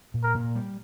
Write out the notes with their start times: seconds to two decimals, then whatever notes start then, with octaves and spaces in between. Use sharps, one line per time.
0.14 A#2
0.24 A#4
0.35 A#2
0.55 G3